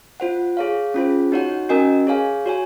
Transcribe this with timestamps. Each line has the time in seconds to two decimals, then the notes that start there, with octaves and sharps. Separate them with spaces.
0.20 F4 C5 F#5
0.57 G#4 C#5 F5
0.94 C#4 F4 G#4 C5
1.32 D#4 F#4 C#5 F#5
1.69 C#4 F#4 A#4 D#5 G#5
2.07 G#4 C#5 F5 G#5
2.46 F#4 C#5 G#5